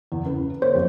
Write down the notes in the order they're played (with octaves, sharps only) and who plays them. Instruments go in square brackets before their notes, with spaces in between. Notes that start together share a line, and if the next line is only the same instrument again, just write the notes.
[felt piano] E2
C#3 B4
[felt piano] A#3 [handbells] C5 C#5
[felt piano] F2